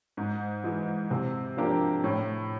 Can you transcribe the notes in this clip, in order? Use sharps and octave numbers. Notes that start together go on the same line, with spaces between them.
G#2
E3 G#3
C3
F3 A#3 D4 G4
A2